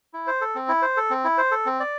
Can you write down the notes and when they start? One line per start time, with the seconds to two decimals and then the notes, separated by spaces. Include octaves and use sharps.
0.13 E4
0.27 C5
0.41 A4
0.55 C4
0.69 E4
0.82 C5
0.97 A4
1.10 C4
1.24 E4
1.38 C5
1.51 A4
1.66 C4
1.80 D5